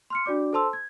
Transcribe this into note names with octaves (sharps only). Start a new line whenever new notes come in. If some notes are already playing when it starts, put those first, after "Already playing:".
C6 F6 C#7
D4 F#4 D5 D6
A4 C5 A5 C6 E6
G#6